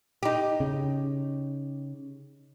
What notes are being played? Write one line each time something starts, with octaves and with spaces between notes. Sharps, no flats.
D#4 G4
C#3